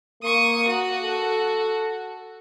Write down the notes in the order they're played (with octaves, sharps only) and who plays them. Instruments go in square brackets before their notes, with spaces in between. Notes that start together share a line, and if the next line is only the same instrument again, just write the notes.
[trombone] A#3 [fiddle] C#6 D#6
[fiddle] F#4
[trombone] A4